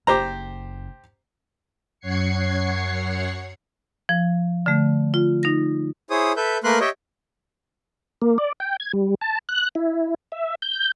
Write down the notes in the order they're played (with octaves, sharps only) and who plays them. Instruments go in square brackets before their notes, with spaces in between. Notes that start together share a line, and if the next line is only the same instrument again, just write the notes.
[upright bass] F#1 [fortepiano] G4 C5 A#5
[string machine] F#2 C#5 F#5 G#6 C7 C#7
[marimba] F3
D3 A3
F4
D#4 A#6
[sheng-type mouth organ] E4 G#4 C5 C#5 D#6
A4 B4 E5 G6
A3 A#3 A#4 B4 C6 F#6
G4 C#5 D#5 E5 G5
[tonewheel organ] A#3
D5
G5
G#6
G3
A5
F#6
E4
E5
G6